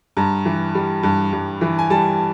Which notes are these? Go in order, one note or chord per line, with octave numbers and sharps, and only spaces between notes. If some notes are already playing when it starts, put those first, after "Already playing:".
G2 A#5
E3
G3
G2
G2
E3
G#5
G3 A5